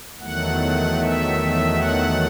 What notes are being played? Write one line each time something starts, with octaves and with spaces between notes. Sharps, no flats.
E2 D#3 F#3 A3 F#5
E5
F#5